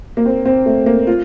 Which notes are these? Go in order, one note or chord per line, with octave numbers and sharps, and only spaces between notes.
A#3
C4
C4
A3
A#3
F4